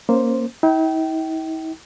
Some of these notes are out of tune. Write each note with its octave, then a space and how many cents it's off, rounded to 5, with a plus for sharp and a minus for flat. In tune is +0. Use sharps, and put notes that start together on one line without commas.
A#3 +0 C#4 -10 C5 +0
E4 -45 G5 -25